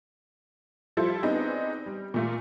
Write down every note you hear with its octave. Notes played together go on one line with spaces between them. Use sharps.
F3 G3 E4 F4 A4 C5
B3 C4 D4 D#4 G#4 B4
G3
A#2 A3 F4